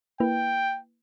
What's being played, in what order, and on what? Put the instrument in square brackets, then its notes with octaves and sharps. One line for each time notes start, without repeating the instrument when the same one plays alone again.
[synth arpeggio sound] A#3 E4 B4 [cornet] G5